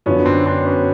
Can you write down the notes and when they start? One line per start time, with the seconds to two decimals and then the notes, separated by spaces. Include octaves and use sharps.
0.06 F#2 D3 F3 B3 C#4
0.25 C4 D4
0.46 C4 D4
0.65 B3 C#4